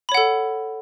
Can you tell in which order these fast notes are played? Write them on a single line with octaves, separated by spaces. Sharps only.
B5 C#5 F#5 A4